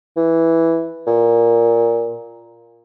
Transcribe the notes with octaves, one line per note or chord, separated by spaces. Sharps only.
E3
A#2